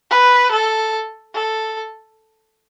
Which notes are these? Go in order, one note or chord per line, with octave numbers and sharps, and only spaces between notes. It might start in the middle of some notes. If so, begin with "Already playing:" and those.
B4
A4
A4